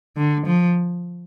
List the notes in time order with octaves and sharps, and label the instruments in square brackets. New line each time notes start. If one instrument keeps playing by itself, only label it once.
[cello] D3
F3